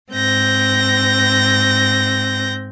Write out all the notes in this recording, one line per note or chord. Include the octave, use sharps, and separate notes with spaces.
G#2 C4 G6 A#6